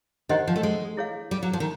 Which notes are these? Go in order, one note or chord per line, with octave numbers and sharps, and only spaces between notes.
D#3 D4 G4 C5 D#5 F#5
F3
A3
G#3
E4 G#4 C#5 F5
G3
F#3
F3
D#3